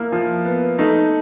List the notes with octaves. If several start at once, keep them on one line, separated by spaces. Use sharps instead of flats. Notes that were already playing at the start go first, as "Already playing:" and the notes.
Already playing: A#3 E4
F3
B3
A3 D#4